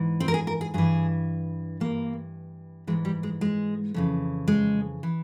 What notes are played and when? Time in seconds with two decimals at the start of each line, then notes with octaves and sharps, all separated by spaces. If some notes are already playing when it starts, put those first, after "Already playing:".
Already playing: G#2 E3
0.20 C4
0.28 A#4
0.34 G#4
0.47 A#4
0.61 G#4
0.74 G2 E3 G#4
1.80 G2 E3 A#3
2.87 G#2 E3 G#3
3.05 G3
3.23 G#3
3.41 G#3
3.94 F2 C#3 E3
4.48 G#3
5.03 E3